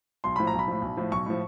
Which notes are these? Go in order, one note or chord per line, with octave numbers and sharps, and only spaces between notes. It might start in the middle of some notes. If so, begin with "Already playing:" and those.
B1 C6
A2 F3 B5
A#5
B1
B5
A2 F3
B1
A2 F3
B1 C#6
A2 F3